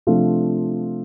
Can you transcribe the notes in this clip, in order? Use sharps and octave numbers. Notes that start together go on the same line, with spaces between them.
C3 F3 A3 D4 F4